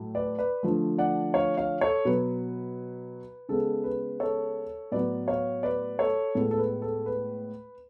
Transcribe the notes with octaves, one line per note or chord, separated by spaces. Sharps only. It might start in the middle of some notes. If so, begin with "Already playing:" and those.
Already playing: A2 F#3 A3
B4 D5
B4 D5
D3 F3 A3
D5 F#5
C#5 F5
C#5 F5
A4 C#5
B2 F#3 B3 B4
C#3 G#3 B3 A4
B4
A4 C#5
A2 F#3 B3 B4 D5
C#5 F5
B4 D5
A4 C#5
A2 G#3 B3 A4
A4
B4
A4
B4